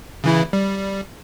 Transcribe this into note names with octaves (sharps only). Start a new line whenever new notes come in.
C#3 E3 E4
G3